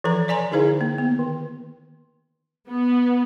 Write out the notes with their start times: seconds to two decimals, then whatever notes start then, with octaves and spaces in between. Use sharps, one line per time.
0.04 E3 F3 A4 B4 A#5
0.28 C#5 D5 G#5 A#5 C6
0.52 D3 D#4 E4 G#4 C5 F5
0.81 A#3
0.98 B3
1.19 D#3
2.69 B3